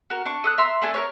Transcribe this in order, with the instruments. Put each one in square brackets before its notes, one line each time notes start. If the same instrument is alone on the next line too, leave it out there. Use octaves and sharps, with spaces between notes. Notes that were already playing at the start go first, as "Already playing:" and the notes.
[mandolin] F#4 A#4
D4 C#6
A4 D#6 F#6
E5 A#5 C6 E6
A3 D4 G#4 A4
A#4 B4 C#5